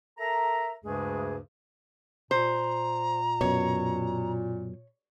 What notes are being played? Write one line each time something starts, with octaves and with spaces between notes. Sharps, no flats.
A4 A#4 E5 A#5
D2 G2 C#3 G#3 A3 G#4
A#2 C5 A#5
F#2 B2 C#5